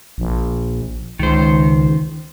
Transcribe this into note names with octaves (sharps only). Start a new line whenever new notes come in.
A#1
C#2 D#3 C5